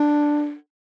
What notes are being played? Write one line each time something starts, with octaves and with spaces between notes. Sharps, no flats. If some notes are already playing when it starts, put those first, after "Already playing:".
Already playing: D4